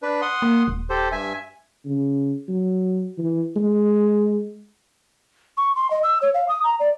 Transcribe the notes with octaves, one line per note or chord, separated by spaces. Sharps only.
D4 B4
F#5 C6 D#6
A#3
D#1
G4 A4 C5
G2 E5 G#5
C#3
F#3
E3
G#3
C#6
C6
D#5
E6
C#5
F5
D#6
A#5
D5